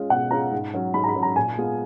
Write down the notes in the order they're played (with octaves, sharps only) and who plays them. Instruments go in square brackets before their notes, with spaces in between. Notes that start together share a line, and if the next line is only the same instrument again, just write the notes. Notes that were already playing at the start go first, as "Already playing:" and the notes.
Already playing: [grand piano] G#3 C#4 F4
[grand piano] B2 [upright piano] F#5
[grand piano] G#3 C#4 F4 [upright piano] A#5
[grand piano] G#2
F#3 C#4 F#4
[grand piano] G#2 [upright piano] B5
[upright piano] A#5
B5
[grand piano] F#3 C#4 F#4
[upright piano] A#5
[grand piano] A#2 [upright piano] G#5
[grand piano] G#3 B3 F4